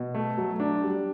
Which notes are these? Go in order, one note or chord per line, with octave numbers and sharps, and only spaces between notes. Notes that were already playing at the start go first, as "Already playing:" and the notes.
Already playing: B2
A3
F#3
D4
G3